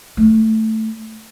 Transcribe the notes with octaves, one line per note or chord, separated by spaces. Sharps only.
A3